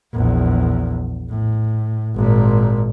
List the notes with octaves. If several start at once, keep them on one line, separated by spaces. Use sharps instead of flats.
A#1 E2
A2
G#1 A#2